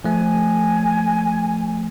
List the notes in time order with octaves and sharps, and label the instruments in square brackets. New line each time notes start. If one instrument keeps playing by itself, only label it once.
[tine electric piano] F3 A3 [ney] G#5